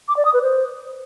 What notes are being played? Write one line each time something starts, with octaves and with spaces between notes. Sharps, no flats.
D6
D5
D#6
B4
C5